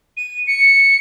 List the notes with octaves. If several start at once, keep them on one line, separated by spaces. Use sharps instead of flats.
D#7
C#7